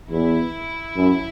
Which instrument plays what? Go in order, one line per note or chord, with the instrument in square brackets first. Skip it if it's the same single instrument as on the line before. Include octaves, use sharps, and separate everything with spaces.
[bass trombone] E2 [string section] E4
[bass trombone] F#2